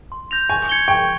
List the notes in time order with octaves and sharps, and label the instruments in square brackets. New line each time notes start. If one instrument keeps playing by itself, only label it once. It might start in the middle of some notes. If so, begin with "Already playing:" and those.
[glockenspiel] C6
G6 A#6 F7
[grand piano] G#5 [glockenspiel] C#6
[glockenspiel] G#6 C#7 G7
[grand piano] G5 [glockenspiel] C#6